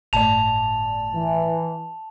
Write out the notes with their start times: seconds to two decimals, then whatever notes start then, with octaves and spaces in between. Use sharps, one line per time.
0.13 G1 A2 D5 A5 F7
1.15 E3